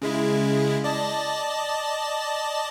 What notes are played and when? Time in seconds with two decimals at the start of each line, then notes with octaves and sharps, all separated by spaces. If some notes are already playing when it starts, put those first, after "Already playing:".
0.02 C#3 G#3 E4
0.84 D5 D#5 A5